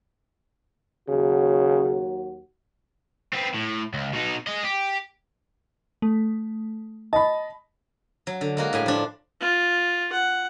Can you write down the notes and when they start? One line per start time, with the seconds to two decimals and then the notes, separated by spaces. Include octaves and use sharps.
1.09 D#2 C#3 F#3 F#4
3.33 B3 C4
3.54 A2
3.94 C#2
4.13 B2 D#4
4.47 G#4 D#5
4.64 G4
6.02 A3
7.13 D#5 A5 B5
8.27 F#3
8.41 D3
8.57 G#3 A#3 F#4
8.73 A2 G3 G#5
8.86 F3 D4
9.41 F4
10.12 F#5